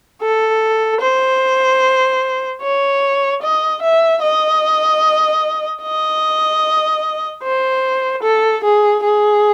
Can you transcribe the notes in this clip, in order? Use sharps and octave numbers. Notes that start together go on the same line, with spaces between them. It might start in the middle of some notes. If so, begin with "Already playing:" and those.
A4
C5
C#5
D#5
E5
D#5
D#5
C5
A4
G#4
G#4